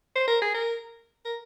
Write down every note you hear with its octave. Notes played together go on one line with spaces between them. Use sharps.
C5
A#4
G#4
A#4
A#4